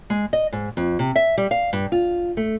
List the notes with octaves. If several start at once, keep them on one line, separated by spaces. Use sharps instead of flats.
G#3
D#5
G#2
F2
C3
E5
G3
F5
G2
F4
A3